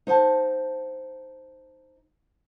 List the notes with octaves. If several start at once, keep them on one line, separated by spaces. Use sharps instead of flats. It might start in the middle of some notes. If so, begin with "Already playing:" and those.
D#4 C5 F#5 A5